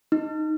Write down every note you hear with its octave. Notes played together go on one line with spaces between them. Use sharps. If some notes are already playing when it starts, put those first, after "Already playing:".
D#4